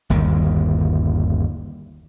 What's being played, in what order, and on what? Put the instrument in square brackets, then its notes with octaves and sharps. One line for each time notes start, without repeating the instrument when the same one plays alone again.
[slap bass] G1 D#2 D#3